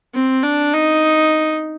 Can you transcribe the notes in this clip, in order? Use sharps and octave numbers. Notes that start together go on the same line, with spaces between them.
C4
D4
D#4